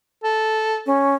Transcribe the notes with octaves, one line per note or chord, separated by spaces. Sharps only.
A4
C#4